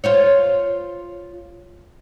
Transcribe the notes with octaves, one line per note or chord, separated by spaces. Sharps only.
F4 C5 C#5